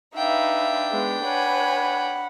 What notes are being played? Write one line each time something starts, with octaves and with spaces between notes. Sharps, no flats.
D4 D#4 B4 E5 F5 G5
G#3 B3
B4 C#5 F#5 G#5 B5